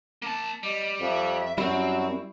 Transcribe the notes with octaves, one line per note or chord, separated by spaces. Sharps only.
A#3 A5
G3 D#5
F2 E5
F#2 G3 C4 E4 F#4